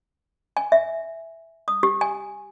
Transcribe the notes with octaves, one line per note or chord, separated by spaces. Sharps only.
G#5
E5
D#6
G4
G#5